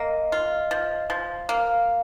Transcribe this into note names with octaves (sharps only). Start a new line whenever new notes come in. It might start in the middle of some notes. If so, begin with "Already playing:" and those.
Already playing: A#3 D#5
F4
F3
F3
A#3 F5